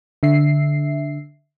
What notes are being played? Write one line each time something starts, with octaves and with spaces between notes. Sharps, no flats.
D3 E5 C7